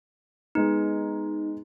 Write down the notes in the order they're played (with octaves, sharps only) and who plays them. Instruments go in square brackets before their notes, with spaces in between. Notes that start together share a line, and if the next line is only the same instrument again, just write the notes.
[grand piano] G#3 B3 [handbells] D#4